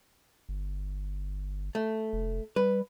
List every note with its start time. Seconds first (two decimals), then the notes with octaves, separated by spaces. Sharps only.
0.49 G1
1.75 A3
2.13 F1
2.56 G3 B4